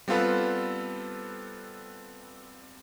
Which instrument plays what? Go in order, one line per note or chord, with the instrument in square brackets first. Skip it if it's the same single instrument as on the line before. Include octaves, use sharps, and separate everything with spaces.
[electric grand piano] G3 B3 C4 F4 A4 B4